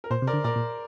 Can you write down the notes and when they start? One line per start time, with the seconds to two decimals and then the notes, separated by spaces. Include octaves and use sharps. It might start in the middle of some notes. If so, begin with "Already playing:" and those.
0.04 A#4
0.11 A#2 C5
0.22 C3
0.27 A#4 D5
0.33 D3
0.44 A#2 A#4 D5
0.56 A#2